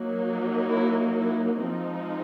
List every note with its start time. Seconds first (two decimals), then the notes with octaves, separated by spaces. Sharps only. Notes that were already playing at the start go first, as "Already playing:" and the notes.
Already playing: F#3 A#3 D#4
0.71 E4
1.18 E4
1.63 F3 G#3 C4 D#4